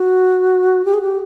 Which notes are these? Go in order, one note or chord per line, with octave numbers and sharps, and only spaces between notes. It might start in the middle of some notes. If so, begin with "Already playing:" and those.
Already playing: F#4
G4
G#4
G4